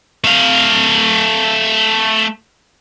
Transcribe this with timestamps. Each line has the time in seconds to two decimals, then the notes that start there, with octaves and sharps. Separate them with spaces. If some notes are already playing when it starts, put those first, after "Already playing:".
0.24 A3 F5